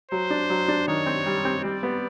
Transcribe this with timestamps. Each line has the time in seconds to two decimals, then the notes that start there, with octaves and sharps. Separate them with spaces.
0.11 F#3 C5
0.30 D4
0.50 F#3
0.68 D4
0.88 D#3 C#5
1.06 C4
1.26 G3
1.45 C4
1.64 G3 D5
1.83 B3